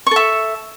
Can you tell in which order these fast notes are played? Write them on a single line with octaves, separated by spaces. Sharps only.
C#6 A4 E5